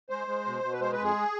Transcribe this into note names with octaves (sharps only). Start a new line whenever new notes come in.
G#3 C5
G#3
B2
B2
B4
G#3 C5
B4
F2
G#4